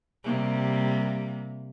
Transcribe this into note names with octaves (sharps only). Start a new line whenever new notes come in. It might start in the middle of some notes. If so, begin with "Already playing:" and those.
C3 G3 A#3